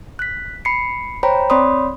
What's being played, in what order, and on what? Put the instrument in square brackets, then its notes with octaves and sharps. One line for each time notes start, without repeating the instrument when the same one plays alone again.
[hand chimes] F#6 B6
B5 C7 C#7
C5 C#5 G5 A#5 B5
C4 C#5 D5 B5 C6 D#6